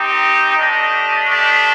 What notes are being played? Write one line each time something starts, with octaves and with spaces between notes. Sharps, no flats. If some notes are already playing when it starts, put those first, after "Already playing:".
Already playing: C4 D#4 G4
A3 D4 G4 D#5
A3 D4 G4